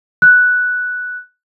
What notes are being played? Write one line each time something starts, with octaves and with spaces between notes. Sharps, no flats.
F#6